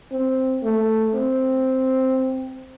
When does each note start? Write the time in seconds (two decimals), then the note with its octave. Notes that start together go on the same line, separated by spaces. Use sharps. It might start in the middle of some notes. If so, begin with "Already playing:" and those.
0.12 C4
0.63 A3
1.14 C4